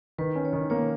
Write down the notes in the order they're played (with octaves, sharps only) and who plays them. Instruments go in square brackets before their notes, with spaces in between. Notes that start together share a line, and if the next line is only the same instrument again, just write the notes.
[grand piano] D#3 [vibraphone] B4
[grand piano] C#4
[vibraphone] C#5
[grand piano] D#3
[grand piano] A#3 [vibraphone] C#5